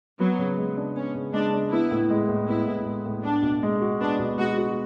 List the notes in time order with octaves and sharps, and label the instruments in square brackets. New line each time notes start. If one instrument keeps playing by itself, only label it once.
[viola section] F#3 [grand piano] B3
[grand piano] C#3
G#3
D4
[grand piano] B3 [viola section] C#4
[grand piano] C#3
[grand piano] G#3 [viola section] D4
[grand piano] D4
[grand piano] B3 [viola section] E4
[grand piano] A2
G#3
A2
[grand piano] B3 [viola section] E4
[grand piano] A2
G#3
A2
[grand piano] B3 [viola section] D4
[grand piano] B2
G#3
F#4
[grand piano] B3 [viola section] D4
[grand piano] B2
[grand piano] G#3 [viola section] F#4
[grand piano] F#4